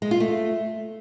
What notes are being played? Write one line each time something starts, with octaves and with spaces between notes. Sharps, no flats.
G#3
F4
A3